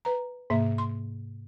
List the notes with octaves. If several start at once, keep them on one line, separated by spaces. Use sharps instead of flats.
B4 A#5
G#2 C3 A#3 E5
C6